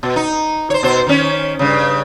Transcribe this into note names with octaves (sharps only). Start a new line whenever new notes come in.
B2
D#4
C5 C#5
B2 C5
D#3 C#4
G2 C#3